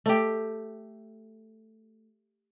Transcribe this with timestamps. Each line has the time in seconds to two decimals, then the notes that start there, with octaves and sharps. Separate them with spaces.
0.06 A3 G4